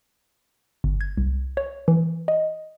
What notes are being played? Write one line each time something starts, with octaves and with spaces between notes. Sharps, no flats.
G1
G#6
C2
C#5
E3
D#5